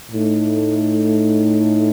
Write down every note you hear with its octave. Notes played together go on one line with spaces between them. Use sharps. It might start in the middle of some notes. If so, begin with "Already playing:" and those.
A2 A3 D#4